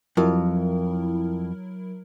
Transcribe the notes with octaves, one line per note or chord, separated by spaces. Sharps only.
F2 F#3 E4 A#4